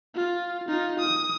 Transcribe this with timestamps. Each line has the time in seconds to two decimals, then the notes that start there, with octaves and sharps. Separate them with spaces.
0.15 F4
0.68 D#4 F4
1.00 D#6